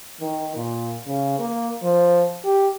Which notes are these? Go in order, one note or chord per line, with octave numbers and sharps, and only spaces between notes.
D#3
A#2
C#3
A#3
F3
G4